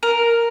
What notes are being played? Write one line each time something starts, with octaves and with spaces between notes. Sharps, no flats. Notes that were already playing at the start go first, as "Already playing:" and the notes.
A#4